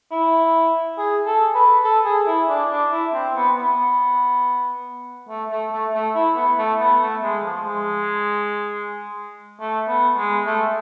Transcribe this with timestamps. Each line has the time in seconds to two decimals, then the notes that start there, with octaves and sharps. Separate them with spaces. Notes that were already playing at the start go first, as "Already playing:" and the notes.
0.12 E4
0.98 G#4
1.26 A4
1.55 B4
1.84 A4
2.05 G#4
2.27 E4
2.49 D4
2.70 D4
2.92 E4
3.13 C4
3.35 B3
3.56 B3
5.29 A3
5.51 A3
5.72 A3
5.94 A3
6.15 E4
6.36 B3
6.58 A3
6.80 B3
7.01 A3
7.23 G#3
7.44 F3
7.66 G#3
9.60 A3
9.88 B3
10.18 G#3
10.46 A3